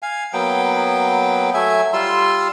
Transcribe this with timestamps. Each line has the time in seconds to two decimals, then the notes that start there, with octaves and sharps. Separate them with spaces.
0.02 F5 G#5
0.33 F#3 A#3 B3 G5
1.54 F#3 A3 E5 G#5
1.93 G3 F4 C6 E6